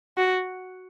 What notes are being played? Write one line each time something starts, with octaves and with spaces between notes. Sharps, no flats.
F#4